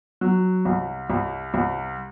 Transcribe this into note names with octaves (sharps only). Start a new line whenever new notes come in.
F#3
C2
C2
C2